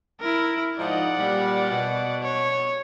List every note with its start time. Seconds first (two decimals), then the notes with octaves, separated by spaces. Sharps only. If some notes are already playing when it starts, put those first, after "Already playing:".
0.21 E4 A#4
0.79 G#2 F3 D#4 D5 F#5
1.19 A#2 G3
1.71 B2
2.21 C#5